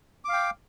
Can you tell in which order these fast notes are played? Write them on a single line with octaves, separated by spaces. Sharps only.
D6 F5 G5